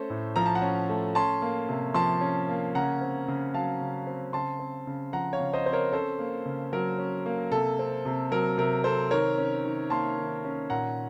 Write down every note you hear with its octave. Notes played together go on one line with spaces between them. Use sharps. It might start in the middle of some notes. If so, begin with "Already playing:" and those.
Already playing: A3 C#4 A4 C5
A2
F3 A#5
A5
F#5 A#5
C#4
A3
C#4 A5 C6
A#3
C3
F3 A5 C6
C#4
A#3
C#3 F#5 A#5
C4
C#3
F#3 F5 A5
C#3
C4
C#3 A5 C6
C4
C#3
F3 F#5 A#5
C#5 F5
C#3
C5 D#5
C4 C5
A#4 C#5
C#4 A4 C5
A#3
C#3
F#3 A#4
C#4
A#3
C3 A4
C4
C3
F#3 A#4
C3 A#4
C4 A4 C5
D#3 A#4 C#5
C#4
D#3
A#3 A5 C6
D#3
C#4
A#2 F#5 A#5